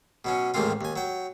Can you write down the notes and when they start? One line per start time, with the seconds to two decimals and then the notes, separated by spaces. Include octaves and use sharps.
0.25 B2 F#3 C#4
0.54 A1 D#2 G#2 A#3 C4 F4
0.81 D#2 G#5
0.96 F#3 G5